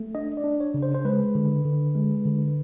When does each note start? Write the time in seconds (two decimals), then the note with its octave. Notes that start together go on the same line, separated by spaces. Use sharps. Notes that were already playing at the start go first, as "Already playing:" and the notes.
Already playing: A3
0.15 D4 D#5
0.37 D5
0.44 D4
0.60 C#5
0.74 C#3
0.83 C5
0.95 C5
1.05 G#3 B4
1.35 D3
1.65 D3
1.95 G#3
2.25 D3